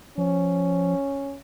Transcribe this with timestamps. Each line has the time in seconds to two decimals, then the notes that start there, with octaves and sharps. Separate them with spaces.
0.18 F3 C#4